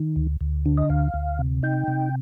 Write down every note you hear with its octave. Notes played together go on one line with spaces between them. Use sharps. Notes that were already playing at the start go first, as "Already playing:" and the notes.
Already playing: D#3
D2
D2
D3
D#5
D2 F5
D2
C3
D#4 G5
C3